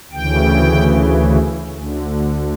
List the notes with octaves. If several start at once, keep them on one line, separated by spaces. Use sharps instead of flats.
D2 C#3 E3 G5
D2 D3